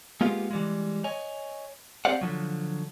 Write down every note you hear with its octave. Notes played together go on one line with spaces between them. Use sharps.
G#3 A#3 B3 F4 G4 F5
E3 G3 G#3
C#5 D#5 G#5
C4 G4 C5 D5 F5 F#5
D3 F3 F#3